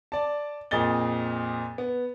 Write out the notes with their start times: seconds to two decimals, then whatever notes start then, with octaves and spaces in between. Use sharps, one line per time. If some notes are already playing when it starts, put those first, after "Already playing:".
0.12 D5 A5
0.71 F2 A#2 G#4 D#5 A6 G7
1.78 B3